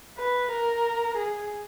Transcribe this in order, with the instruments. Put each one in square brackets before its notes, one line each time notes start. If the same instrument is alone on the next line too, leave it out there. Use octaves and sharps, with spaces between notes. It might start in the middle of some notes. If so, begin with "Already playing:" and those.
[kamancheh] B4
A#4
G#4